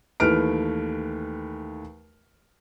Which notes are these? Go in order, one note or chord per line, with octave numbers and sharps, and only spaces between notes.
D#2 E3 A3 B4 F6 D7